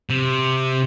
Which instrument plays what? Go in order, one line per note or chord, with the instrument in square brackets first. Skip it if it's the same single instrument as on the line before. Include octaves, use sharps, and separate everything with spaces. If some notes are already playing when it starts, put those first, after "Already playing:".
[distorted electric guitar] C3